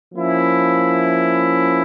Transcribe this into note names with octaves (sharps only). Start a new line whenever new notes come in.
F3 A#3 C#4 E4